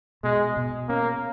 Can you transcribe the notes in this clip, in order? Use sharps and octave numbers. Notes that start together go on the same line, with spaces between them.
B2 G#3
B2
A#3 C#4